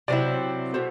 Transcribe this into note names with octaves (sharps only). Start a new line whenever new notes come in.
C3 F#3 C4 E4 D5
B2 A3 C5